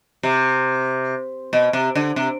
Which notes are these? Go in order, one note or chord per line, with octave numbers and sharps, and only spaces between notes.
C3
B2
C3
D3
C3